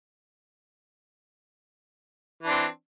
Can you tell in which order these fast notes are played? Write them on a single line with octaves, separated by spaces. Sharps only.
E3 D4 C4